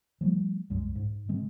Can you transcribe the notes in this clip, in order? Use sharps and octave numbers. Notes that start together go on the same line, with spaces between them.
F3 G3 A3
C2 F#2 G#3
G#2
C#3 G#3 C4